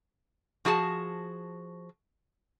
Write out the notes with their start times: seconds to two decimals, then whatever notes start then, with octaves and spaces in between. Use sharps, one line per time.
0.65 F3 F#4 G#4 A5